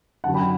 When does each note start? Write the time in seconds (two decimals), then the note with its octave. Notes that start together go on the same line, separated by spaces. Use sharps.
0.24 F#2 D3 F#3 F#5 A5
0.34 G5 B5